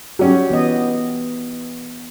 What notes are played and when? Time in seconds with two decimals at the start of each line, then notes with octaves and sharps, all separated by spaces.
0.19 F#3 C#4 G4
0.50 E3 B3 D#5